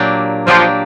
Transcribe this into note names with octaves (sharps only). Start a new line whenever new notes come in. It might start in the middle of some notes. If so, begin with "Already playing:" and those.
Already playing: A#2 F#3 A#3 D4 G4
A#2 F3 F#3 A#3 D4 G4